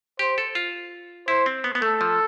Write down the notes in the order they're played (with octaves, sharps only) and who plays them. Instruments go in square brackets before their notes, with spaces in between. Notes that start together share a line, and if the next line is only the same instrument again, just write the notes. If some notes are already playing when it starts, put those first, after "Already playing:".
[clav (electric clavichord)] G4 [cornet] C5
[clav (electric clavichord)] A4
F4
[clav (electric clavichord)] E4 [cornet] C5
[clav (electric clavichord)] C4
B3
B3
[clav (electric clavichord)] A3 [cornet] A4
[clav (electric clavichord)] F3